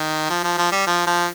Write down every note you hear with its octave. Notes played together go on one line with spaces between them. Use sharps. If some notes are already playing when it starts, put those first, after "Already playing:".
Already playing: D#3
F3
F3
F3
G3
F3
F3